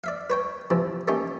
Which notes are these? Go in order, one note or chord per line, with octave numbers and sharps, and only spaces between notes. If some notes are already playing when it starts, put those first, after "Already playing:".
D5 E5 F5
B4 C#5 G5
C3 E3 F3
A3 A#3 C#4 D#4 G4